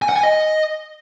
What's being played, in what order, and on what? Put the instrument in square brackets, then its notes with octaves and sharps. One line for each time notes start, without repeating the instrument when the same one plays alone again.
[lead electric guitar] G#5
F#5
G#5
D#5